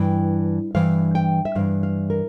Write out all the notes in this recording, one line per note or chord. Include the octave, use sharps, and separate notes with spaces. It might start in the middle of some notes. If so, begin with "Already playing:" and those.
Already playing: G2 E3 G5
G2 E3 F5
G5
E5
G2 E3 F5
F5
A#4